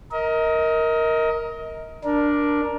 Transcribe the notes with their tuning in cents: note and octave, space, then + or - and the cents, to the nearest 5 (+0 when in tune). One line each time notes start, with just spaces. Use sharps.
A#4 +0 D#5 +30
D4 +0 A#4 +10